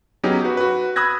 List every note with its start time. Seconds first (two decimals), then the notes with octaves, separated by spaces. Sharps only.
0.23 F#3 B3 C#4 D#4 G4 G#4
0.45 F#4 B4
0.57 F#4 B4
0.96 B5 D#6 E6 F#6 G#6 A#6